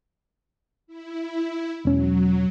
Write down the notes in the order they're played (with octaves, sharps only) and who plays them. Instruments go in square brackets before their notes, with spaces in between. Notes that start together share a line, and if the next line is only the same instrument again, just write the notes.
[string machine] E4
[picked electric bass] E1 C#4 [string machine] F#3